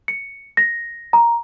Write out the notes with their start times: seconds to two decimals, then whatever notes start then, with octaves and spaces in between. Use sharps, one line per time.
0.08 C#7
0.57 A#6
1.13 A#5